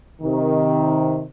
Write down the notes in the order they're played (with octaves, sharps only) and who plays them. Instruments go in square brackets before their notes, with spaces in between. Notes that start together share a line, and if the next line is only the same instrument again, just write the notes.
[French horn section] C3 D#3